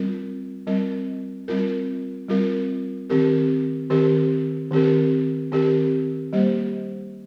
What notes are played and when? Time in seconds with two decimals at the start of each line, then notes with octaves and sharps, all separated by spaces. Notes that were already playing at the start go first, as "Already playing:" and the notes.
Already playing: G3 C4 F4 A#4
0.67 G3 C4 F4 A#4
1.48 G3 C4 F4 A#4
2.28 G3 C4 F4 A#4
3.10 D#3 C4 G4 A#4
3.90 D#3 C4 G4 A#4
4.71 D#3 C4 G4 A#4
5.52 D#3 C4 G4 A#4
6.33 G3 A#3 G4 C5